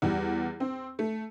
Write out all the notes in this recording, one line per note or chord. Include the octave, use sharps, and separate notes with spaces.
E2 G3
C4
A3